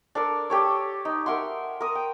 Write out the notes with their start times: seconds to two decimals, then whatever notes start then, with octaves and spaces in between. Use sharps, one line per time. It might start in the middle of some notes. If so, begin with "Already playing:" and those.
0.15 D4 A4 A#4
0.50 G4 A4 C#5
1.05 D#4
1.26 A#4 E5 F#5 C6
1.81 A#4 D#6
1.95 G5